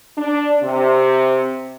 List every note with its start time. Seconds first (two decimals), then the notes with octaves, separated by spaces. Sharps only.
0.17 D4
0.62 C3